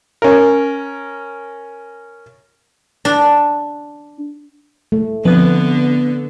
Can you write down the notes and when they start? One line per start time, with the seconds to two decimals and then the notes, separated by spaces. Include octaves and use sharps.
0.22 C#4 A#4
3.05 D4
4.92 A3
5.25 D3 F3 B3 C4 B4